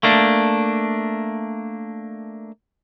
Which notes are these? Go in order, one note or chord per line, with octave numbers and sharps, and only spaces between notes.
A3 A#3 D4